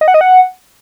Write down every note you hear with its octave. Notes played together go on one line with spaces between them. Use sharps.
D#5
F#5
D#5
F#5